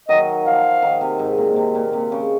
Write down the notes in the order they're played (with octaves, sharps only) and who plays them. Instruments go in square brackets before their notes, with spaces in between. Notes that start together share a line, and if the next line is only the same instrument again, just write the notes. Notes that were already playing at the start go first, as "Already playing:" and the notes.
[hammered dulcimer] D#3 F#3 [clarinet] D#5
[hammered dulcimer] F3 [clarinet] F5
[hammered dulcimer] D#3
C3
G#2
A#2
C3
A#2
C3
C#3